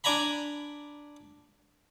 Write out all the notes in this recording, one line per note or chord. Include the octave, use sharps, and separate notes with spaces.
D4 D5 G#5 A#5 B5